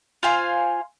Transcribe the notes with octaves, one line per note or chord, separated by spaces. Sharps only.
F4 C5 F5 G#5